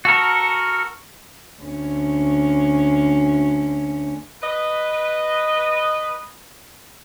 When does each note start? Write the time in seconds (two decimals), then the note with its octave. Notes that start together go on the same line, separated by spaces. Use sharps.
0.05 F#4 A4 A#4
1.62 D2 C#4
4.43 B4 D#5